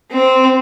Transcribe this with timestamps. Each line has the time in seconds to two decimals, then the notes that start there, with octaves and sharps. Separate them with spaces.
0.11 C4